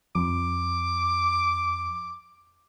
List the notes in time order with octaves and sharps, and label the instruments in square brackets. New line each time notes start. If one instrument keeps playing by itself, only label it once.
[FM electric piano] F2 [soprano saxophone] D6